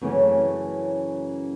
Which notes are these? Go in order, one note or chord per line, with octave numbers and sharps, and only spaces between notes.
F#2 C#3 E3 A3 C#4